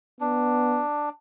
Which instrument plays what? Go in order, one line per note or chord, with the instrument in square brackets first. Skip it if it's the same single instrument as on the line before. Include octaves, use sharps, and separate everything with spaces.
[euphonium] B3 [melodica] D4